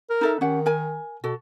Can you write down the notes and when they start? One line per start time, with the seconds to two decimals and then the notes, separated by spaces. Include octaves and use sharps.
0.10 A#4
0.21 D#4 A4 E5
0.41 D#3 C#4 G4 F#5
0.66 A#4 G#5
1.24 B2 F#4 A4